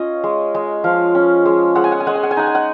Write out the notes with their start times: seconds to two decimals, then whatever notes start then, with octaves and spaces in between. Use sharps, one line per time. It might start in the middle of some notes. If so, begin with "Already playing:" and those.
Already playing: C#4 F4 C#5 D#5
0.24 G#3
0.55 G#3
0.84 F3 F5
1.15 C#4
1.45 G#3
1.75 G#3 F#5
1.84 G#5
1.92 F#5
2.00 G#5
2.07 G#3 F#5
2.15 G#5
2.23 F#5
2.31 G#5
2.37 D#4 F#5
2.47 G#5
2.55 F#5